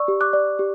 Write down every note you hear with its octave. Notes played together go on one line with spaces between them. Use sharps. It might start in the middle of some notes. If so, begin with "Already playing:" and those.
Already playing: D5 C#6 E6
G4
D6 F#6
D5
G4